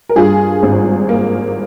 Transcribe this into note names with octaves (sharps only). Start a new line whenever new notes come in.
A#4
G2 F4 G#4
G#1
A#3